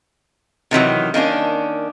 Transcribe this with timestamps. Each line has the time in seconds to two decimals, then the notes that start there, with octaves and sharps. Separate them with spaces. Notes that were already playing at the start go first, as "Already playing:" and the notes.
0.71 C3 D#3 E3 F#3
1.14 D#3 A#3 C#4 D4